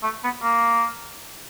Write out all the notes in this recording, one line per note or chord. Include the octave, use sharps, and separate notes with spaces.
A3
B3
A#3